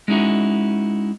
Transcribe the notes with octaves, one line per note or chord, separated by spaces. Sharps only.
G#3 C#4 D#4 E4 F#4